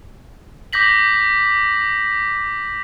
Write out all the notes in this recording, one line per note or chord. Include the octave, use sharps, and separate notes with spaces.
D6 G6 A#6 B6 F#7